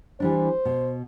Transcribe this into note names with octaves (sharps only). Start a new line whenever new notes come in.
E3 G3 D4 C5
B2